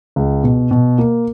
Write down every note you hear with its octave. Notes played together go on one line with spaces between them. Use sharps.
C#2
B2
B2
A#3